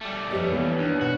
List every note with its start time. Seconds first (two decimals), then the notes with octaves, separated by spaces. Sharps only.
0.01 G3 A3 D6
0.31 F2 G4 B4 C#5 D#5
0.52 E3 B3 F5
0.78 D#2 D4
1.01 B2 F#4